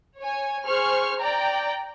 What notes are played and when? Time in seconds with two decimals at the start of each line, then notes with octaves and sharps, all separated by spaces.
0.19 C#5 G#5
0.65 G#4 C5 C#6 F6
1.19 D5 G5 A#5